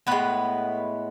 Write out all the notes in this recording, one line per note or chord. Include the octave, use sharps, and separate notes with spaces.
A2 G#3 B3 B4